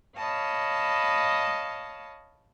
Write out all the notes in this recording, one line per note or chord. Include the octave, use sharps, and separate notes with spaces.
C#5 D#5 F5 A5 B5